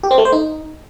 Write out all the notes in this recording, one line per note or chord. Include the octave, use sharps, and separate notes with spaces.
G4
C4
A3
C5
D#4